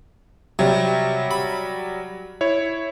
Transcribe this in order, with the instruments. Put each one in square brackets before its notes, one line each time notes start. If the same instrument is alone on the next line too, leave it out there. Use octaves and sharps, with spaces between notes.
[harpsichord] C3 [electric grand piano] F#3 G3
[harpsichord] B5
[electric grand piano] E4 C#5